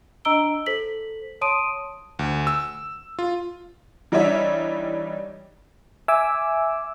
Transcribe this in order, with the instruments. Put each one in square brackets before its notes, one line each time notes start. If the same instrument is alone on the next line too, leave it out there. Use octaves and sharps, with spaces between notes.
[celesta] D4 D#5 A#5 E6 D7 G7
A4 C5 B6 F#7
C#5 A5 C6 D#6 D7 D#7
[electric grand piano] D2
E6
F4
[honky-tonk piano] E3 G3 D4 D#4 C#5 E5
[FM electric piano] E5 G#5 D6 E6